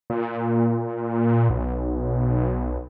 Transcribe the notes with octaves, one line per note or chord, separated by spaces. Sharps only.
A#2
B1